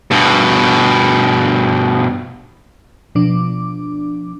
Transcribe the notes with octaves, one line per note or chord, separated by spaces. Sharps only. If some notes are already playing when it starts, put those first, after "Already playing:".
G2 B2
B2 F3 D4 D6